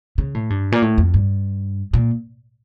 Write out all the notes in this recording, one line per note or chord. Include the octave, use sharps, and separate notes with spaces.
C#3
A2
G2
A#2
A2
F2
G2
A#2